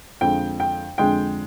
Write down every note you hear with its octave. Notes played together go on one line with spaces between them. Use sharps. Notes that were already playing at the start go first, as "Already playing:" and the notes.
F2 D3 G#3 G5
G5
F2 D3 G#3 G5